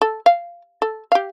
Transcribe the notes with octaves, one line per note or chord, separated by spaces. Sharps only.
A4
F5
A4
G4 F5